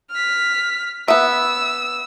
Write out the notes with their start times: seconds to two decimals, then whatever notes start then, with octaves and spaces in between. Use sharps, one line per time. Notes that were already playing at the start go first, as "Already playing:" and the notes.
0.11 F6 B6
1.08 B3 E5 E6